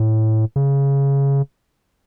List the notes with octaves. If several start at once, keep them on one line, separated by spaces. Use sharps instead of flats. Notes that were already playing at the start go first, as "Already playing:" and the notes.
Already playing: A2
C#3